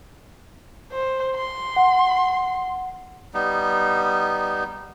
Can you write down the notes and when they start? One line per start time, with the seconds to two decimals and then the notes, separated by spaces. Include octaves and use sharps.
0.91 C5
1.35 C6
1.76 F#5
3.34 G3 B3 D#4